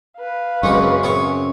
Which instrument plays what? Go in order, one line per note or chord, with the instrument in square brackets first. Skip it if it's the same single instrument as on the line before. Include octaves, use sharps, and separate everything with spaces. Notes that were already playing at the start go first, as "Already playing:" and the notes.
[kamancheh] B4 F5
[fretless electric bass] F#2 C#3 [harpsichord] G#3 A#3 C4 [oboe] C#6
[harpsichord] C4 G#4 C#5